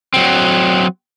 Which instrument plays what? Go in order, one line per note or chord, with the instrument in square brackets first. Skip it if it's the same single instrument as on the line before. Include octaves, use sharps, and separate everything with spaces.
[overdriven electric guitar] F#3 C4